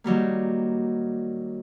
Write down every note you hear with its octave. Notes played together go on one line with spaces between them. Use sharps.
D#3 F#3 G3 A#3